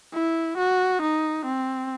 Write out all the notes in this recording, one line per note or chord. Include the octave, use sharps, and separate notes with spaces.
E4
F#4
D#4
C4